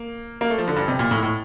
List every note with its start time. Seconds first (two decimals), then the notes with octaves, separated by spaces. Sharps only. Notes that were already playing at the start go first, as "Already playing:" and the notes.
Already playing: A#3
0.41 A#3
0.50 A3
0.58 F3
0.67 D3
0.76 G2
0.88 C3
0.99 A#2
1.11 A2
1.23 A2